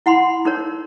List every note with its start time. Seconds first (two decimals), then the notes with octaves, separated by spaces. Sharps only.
0.06 E4 F#5 B5 C6
0.45 D#4 A#4 C#5